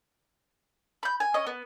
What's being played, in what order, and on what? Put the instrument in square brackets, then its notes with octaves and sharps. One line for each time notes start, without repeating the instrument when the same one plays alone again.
[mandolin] B5 G6
G#5
C#4 D#5
B3